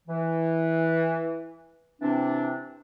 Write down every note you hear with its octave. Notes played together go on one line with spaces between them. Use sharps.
E3
C3 E3 C4 D4